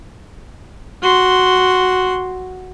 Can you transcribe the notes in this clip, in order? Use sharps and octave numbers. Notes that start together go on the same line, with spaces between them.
F#4 C6